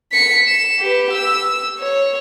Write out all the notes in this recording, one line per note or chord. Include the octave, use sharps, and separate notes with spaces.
B6 C#7
E7
G4 B4
E6
C#5